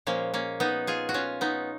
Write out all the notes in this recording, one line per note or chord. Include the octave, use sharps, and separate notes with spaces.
A#2 F3 G#3 A#3 C#4
A#3 C#4
B3 D#4
F4 G#4
F#4
C#4 F4
B3 D#4